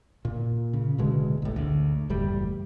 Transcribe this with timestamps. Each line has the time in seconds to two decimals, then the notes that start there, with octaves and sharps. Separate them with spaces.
0.25 A#2
0.73 C#3
0.98 D1 D2 B2 G#3
1.42 A1 A2
1.56 D2
2.10 F#1 E2 A2 G3